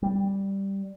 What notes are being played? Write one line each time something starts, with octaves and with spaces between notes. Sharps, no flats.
G3